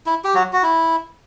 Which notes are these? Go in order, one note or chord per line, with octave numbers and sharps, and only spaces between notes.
E4
G4
F#3 F#4
F#4
E4